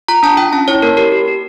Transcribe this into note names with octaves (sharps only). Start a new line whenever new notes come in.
F4 A#5
D4 A5
F4 G5
C#4 A5
E4 C#5
A#3 A#4
G4 A#4
G4
G4